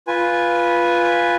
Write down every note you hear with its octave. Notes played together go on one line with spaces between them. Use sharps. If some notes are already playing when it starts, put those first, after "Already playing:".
F4 B4 G#5